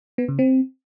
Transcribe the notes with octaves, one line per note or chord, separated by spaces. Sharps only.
B3
C#3
C4